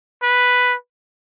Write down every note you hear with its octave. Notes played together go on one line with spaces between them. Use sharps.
B4